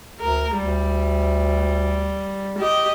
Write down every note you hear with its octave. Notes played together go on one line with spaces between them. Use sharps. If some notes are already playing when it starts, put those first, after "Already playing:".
D2 A#4
D2 G3
G4 D#5